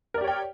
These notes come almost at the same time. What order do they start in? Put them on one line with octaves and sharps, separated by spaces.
A#4 D5 G4 C#5 G5